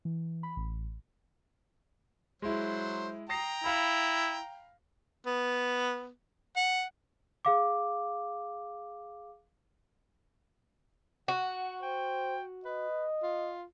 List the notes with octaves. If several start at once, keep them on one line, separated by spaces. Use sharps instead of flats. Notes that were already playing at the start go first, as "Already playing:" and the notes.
E3
B5
A1
F#3 G#3 E4 C5
G5 A#5 D#6 A#6 C7
E4 F5 B5
B3
F#5
G#4 F5 D6
F#4 F#5
C5 G5
B4 D#5
F4